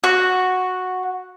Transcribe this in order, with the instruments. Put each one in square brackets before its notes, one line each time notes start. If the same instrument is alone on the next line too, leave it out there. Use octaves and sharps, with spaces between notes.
[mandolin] F#4